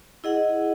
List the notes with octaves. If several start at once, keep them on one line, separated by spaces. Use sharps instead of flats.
E4 G#4 D#5 F#5